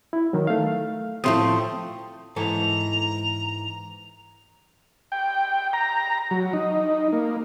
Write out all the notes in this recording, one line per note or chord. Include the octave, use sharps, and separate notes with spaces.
E4
D#3 F#3
A3 F5
A2 F3 A3 C4 C6 D#6
G#2 E3 A4 A#5
G5
A#5
F#3
D#4
A#3